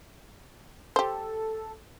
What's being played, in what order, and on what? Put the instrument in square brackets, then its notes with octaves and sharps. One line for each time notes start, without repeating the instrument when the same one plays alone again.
[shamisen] G4 C5 [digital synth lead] A4